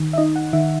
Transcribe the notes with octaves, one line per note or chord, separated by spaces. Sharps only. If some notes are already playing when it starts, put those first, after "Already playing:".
Already playing: D#3
E5
D#4 D#5
F#5
D#3 E5